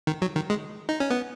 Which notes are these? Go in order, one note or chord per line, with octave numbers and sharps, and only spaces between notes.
D#3
F#3
D#3
G#3
D#4
C#4
B3